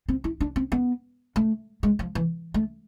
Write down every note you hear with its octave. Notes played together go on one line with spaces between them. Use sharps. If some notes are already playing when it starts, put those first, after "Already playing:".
C4
E4
D4
C4
B3
A3
G#3
F3
E3
A3